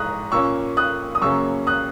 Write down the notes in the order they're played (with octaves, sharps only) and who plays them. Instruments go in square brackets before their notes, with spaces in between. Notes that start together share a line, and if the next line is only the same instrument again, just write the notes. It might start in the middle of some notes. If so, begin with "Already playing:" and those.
Already playing: [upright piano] G#2 E3 G#3 A#5 C#6 D#6 F#6
A#2 A#3 C#4 C#6 E6
D#6 F#6
D#6
F#2 C#3 F#3 A#3 C#4 C#6 E6
D#6 F#6